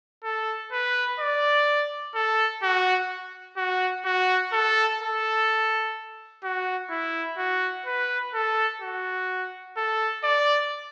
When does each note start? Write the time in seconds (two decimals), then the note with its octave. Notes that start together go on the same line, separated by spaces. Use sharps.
0.24 A4
0.72 B4
1.20 D5
2.15 A4
2.63 F#4
3.57 F#4
4.05 F#4
4.53 A4
5.00 A4
6.43 F#4
6.90 E4
7.38 F#4
7.86 B4
8.34 A4
8.81 F#4
9.77 A4
10.23 D5